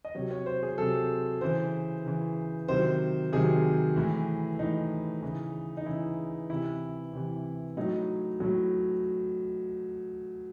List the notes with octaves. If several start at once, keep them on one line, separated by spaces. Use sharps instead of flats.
D#5
C3 F#3 C#5
C#5
C5
G#4
C3 F#3 A4
C#3 E3 C5
C#3 E3
C3 D#3 F#3 C5
C3 D#3 F#3 G#4
A2 E3
A2 E3 D#4
C#3 E3
D#4
C#3 E3 E4
C3 E3 E4
C3 E3
A2 F#3 D#4
A2 F#3